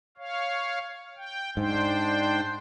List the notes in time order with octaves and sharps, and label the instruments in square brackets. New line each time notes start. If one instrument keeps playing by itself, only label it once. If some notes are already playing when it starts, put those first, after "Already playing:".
[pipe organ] C#5 F5
G5
[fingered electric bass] G#2 [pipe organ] D4 C5 G5